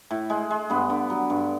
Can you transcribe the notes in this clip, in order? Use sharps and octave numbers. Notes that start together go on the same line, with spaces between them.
A2
G#3
G#3
G2 B3
D3
F#3
G2